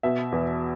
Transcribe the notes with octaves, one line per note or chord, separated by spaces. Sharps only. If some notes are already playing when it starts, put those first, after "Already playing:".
B2 E5
E2